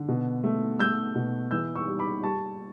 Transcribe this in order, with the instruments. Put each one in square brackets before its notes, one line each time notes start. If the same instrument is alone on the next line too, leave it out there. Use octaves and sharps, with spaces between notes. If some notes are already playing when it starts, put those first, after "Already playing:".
Already playing: [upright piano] D3
B2
A3
A3 E6 G6
B2
E3 E6 G6
C#6 E6
G3
B5 D6
G3 A5 C#6